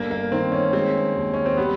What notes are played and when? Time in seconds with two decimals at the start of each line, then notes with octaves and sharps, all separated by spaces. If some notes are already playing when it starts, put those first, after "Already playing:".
Already playing: G1 A#3
0.11 A#3
0.32 D#3 C4
0.52 C#4
0.73 G#3 C4
1.16 D#2
1.34 C#4
1.46 C4
1.57 G3 B3